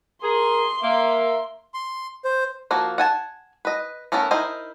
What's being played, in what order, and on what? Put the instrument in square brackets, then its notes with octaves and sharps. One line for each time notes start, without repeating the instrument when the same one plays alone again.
[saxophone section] G#4 [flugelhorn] A#4 [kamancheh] C6
[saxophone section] A#3 [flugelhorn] E5
[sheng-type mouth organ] C6
C5
[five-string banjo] F3 A#3 F#4
F#5 G#5 A5
B4 D#5
A3 B3 C#4 A4 A#4
D#4 E4 A#4 C5 D#5